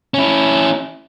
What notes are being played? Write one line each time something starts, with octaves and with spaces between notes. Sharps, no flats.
C#4 E4